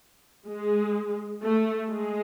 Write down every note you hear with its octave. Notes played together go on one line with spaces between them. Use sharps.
G#3
A3
G#3